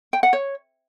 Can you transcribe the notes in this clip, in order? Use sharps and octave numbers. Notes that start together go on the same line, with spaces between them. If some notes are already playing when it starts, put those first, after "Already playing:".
G5
F#5
C#5